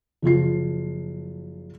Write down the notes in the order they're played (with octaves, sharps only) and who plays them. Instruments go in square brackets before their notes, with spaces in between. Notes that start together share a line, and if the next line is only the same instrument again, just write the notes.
[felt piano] F#1 F3 F4 C7